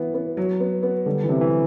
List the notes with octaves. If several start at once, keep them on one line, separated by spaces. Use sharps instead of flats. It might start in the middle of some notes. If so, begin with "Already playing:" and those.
Already playing: E3 B3
B3
F#3
B3
B3
D3 G3
E3
C3
E3